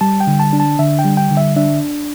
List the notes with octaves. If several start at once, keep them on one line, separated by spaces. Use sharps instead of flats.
G3 A5
G5
D3
A5
D4
A5
D3 E5
G5
G3
G5
D3
E5
D4 E5